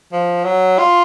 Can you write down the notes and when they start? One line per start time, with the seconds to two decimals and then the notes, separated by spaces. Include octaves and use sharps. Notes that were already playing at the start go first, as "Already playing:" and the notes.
0.12 F3
0.44 F#3
0.79 F4